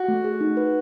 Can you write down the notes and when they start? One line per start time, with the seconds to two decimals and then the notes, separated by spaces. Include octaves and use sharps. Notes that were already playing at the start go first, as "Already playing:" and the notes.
Already playing: F#4
0.08 A3
0.24 G#4
0.41 D#4
0.57 B4